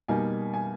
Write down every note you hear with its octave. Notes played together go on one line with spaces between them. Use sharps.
B2 G3 A#3 D#4 G#5
G#5